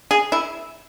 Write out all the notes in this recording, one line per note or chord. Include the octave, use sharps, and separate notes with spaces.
G#4
E4